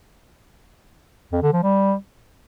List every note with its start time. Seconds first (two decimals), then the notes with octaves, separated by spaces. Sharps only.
1.32 F2
1.43 D3
1.53 F3
1.64 G3